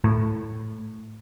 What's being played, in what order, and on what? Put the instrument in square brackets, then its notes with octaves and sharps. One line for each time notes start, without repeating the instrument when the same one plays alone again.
[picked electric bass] A2